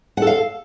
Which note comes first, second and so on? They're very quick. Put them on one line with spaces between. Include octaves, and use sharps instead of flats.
F#5 A4 F5